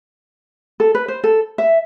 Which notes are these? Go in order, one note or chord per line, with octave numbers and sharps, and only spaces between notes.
A4
B4
C5
A4
E5